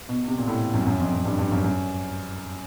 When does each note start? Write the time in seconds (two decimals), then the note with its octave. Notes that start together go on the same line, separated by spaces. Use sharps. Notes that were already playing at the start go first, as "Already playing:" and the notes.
0.09 B2
0.28 C3
0.38 A#2
0.48 A2
0.74 F#2
0.86 F#2
1.00 F2
1.13 F#2
1.25 G2
1.39 G2
1.52 F#2
1.64 F#2